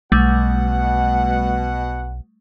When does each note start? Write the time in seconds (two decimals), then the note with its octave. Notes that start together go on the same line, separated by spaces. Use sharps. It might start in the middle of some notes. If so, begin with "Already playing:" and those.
0.12 B1 B2 G3 A3 F#5